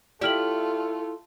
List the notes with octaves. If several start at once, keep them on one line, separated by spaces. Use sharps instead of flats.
A3 E4 F4 G4 A4 D5 F6 F#7